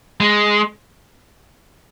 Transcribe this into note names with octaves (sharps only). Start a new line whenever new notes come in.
G#3